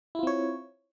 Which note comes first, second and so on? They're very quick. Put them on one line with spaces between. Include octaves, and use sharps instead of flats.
E4 F4 C4 C#5